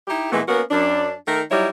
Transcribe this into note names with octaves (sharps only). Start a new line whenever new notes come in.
D#4 E4 G4
A#2 E3 G#3 A3 B3
A#3 B3 C#4 F#4 A#4
F#2 D4
D#3 A3 A#4
F#3 G3 D#4 E4 C#5